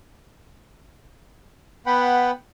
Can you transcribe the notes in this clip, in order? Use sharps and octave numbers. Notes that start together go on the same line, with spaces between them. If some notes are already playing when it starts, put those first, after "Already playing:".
B3 B4 F#5 G5 B5